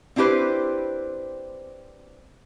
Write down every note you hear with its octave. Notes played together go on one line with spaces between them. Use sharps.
C4 D4 E4 G4 B4 C5